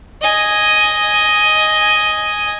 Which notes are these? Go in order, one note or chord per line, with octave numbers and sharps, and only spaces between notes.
D#5 G#5